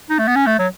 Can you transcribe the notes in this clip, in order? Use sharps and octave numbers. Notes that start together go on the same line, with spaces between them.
D#4
A3
B3
C#4
A3
F#3